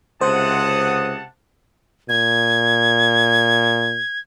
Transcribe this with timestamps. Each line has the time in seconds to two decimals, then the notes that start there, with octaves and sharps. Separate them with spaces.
0.21 C#2 C3 C5 F#5 A5 D#6
2.09 A#2 G#6